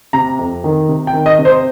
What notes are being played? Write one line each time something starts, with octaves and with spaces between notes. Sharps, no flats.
C3 A#5
F2
D#3
C3
G5
D#3
D#5
C3
C5